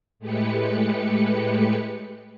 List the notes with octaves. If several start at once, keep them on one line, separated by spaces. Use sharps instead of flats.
A2 G#3 A3 G4 B4 C#7